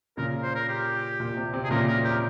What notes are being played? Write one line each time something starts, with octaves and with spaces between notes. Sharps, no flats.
A#2 C#3 A#4
C5
A#4
G4
A#2
C3
C3
C3 G#4
A#2 C#3 A#4
A#4
G4